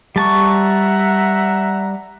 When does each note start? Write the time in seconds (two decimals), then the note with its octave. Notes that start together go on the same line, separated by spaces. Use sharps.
0.16 G3 E5 F#5 A5 A#5 C#6